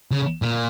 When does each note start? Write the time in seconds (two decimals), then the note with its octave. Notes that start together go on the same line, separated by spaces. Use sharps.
0.11 C#3
0.42 A#2